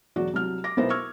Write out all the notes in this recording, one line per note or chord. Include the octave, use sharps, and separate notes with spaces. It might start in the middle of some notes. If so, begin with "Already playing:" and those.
E1 F#3 F#4 D5
C2 F#3 F6
D6 A#6
B1 B3 E4 A#4 C5 A#6
C#6 E6 F6 G#6